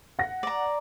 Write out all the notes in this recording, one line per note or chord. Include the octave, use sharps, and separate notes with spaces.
F#5 A#6
D5 A#5